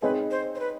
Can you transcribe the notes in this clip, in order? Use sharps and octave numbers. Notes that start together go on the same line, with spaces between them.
C4 D#4 G#4 B4 C#5
C5
C5
B4